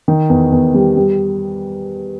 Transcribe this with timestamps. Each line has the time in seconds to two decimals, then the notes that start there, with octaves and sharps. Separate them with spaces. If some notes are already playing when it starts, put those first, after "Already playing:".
0.08 D#3
0.29 E2
0.52 E2
0.74 G3
0.96 G3